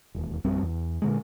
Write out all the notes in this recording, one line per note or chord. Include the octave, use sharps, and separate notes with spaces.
E1 D#2
A#1 F#2 G3 C4
E2
A#2 D3 G#3